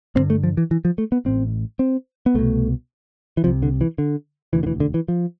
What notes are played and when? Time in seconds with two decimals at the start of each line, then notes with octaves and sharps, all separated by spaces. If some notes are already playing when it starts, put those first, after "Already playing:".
0.15 A1 G2 D3 C4
0.30 A3
0.43 F3
0.57 E3
0.71 E3
0.85 F3
0.98 A3
1.12 B3
1.25 A1 A2 C4
1.79 C4
2.26 B3
2.35 C2 B2 A3
3.37 E3
3.44 C3 F3
3.47 C2
3.63 D3
3.81 E3
3.98 D3
4.53 E1 D2 D3 E3
4.63 D3
4.67 E3
4.80 D3
4.94 E3
5.08 F3